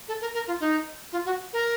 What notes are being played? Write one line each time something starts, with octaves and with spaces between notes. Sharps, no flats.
A4
A#4
A#4
F4
D#4
F4
F#4
A#4